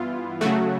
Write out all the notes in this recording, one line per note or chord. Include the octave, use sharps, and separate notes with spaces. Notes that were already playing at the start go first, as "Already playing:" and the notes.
Already playing: G2 E3 B3 E4 F4
C#3 F#3 A3 F#4